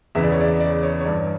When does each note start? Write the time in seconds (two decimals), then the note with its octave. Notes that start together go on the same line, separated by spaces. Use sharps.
0.15 E2 C#3 E3 E5
0.24 D5
0.32 C#5
0.41 D5
0.60 D5
0.83 C#5
1.00 C#5
1.05 G2 E3 D5